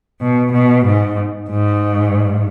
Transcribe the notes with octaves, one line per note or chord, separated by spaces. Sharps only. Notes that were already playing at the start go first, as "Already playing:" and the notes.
B2
B2
G#2
G#2